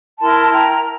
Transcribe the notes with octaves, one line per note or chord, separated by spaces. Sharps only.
E4 A#4 A5 C6
G5 A#5